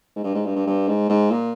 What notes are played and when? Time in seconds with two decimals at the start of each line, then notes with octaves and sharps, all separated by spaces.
0.16 G#2
0.24 G2
0.34 G#2
0.45 G2
0.56 G2
0.67 G2
0.88 G#2
1.09 G#2
1.30 A#2